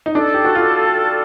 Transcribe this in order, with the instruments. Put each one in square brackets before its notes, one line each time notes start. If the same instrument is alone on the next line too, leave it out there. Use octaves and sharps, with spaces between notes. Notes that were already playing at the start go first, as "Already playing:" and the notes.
[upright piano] D#4
[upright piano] D4 [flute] A4
[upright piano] G4
F#4
F4